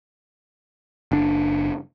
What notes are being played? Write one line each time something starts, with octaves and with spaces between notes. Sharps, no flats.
F#1 D4